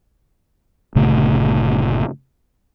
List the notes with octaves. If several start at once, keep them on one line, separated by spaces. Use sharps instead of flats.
G1 A#2 C#3 A3